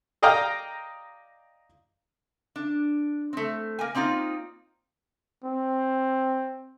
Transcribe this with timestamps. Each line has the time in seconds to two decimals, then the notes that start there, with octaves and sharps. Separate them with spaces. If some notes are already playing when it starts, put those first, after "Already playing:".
0.22 D5 D#5 F5 G5 A#5
2.56 D4
3.33 A3 C4
3.79 A#3 A#4 G#5
3.95 A#3 C4 D#4 F4 D5
5.44 C4